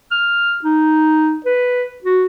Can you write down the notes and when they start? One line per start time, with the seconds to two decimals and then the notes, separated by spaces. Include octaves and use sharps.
0.11 F6
0.64 D#4
1.45 B4
2.04 F#4